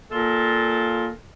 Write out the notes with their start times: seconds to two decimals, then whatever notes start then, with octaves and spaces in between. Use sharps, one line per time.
0.11 A#2 F4 A4